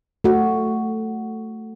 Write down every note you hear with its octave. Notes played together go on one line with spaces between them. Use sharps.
A3 F#4